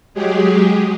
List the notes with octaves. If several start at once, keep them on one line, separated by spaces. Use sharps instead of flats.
F#3 G#3 G4 G#4